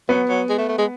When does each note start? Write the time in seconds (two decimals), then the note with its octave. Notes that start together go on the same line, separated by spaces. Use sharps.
0.09 F#3 B3
0.28 F#3
0.49 G#3
0.58 A3
0.68 A3
0.78 G#3